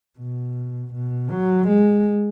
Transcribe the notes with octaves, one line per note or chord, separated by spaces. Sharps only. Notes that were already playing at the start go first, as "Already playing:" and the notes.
B2
B2
F#3
G#3